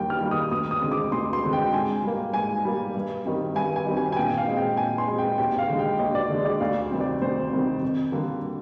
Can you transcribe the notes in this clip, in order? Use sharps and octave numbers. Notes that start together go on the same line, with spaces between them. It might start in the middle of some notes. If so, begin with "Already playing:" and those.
Already playing: D#2 D#3 G3 A#3 G5
F6
D#3 G3 A#3
D#6
D2 D#6
D#6
D3 G#3 C4
D6
D2 C6
C6
D3 G#3 C4
G5
G#2 G#5
G3 A#3
G#2 G#5
G3 A#3
G2
D#3 G3 C4
G2 G#5
G#5
D#3 G3 C4
G#5
G#5
A#2 G5
F5
G#3 C4
G5
A#2 G#5
C6
G#3 C4
G5
D#2 G5
F5
D3 G#3
G5
D#2 D#5
D5
D3 G#3
D5
D2 F5
C3 D#3 G3 C4
D5
D2 C5
C3 D#3 G3 C4
F2
D3 G3 A#3